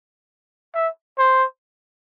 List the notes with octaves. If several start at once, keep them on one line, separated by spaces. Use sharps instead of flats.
E5
C5